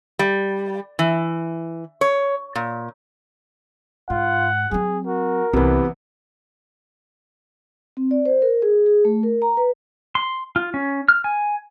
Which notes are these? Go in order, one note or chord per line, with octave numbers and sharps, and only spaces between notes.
G3
E3
C#5
A#2
G#2 F4 F#5
F#3 C4 G#4
F#4 A#4
C2 C3 E3 A#3 B3
C4
D5
C5
A#4
G#4
G#4
A3
A#4
A#5
B4
C6
F4
C#4
F6
G#5